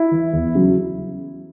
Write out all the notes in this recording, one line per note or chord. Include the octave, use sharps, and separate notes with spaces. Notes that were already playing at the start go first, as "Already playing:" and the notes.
Already playing: E4
E3
E2
C#3 F#3